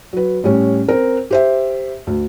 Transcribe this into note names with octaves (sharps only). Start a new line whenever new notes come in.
F#3 B4
A2 G3 C#4
C4 A#4
G4 C5 E5
D2